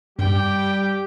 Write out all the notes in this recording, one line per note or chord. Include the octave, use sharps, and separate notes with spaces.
G2 G3 G4 G5